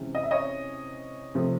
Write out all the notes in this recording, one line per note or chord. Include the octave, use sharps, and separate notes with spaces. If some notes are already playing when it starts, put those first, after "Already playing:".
Already playing: C3 E3 G#3 C#4
D#5
E5
C#5 D#5
C3 F3 A3